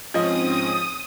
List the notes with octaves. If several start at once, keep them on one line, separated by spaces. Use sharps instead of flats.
G#2 F3 C4 C#4 D#5 D#6